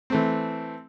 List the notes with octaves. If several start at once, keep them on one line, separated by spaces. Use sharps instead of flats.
E3 A3 C4